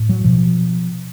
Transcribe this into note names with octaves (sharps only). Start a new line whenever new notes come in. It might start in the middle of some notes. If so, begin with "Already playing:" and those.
Already playing: A2
F#3
B2 F3